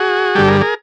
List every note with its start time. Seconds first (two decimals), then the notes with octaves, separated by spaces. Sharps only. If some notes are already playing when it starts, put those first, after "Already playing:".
Already playing: F#4 G#4
0.35 G2 D3 G3 G4 A4
0.48 G#4 A#4
0.61 G#4 A#4